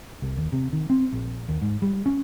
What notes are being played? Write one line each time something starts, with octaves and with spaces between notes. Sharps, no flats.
C2
D#2
C3
D#3
C4
A#1
D#2
G#2
G3
C#4